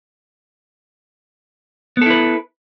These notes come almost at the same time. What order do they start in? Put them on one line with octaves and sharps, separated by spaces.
B3 A4 E4 B4